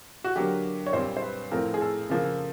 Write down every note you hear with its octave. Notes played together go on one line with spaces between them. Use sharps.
F#4
D3 F#3 A#3 G4
C#5
A#2 G3 C4 C5
C5
B4
A2 F3 A3 C4 A#4
G#4
A4
C#3 F3 A#3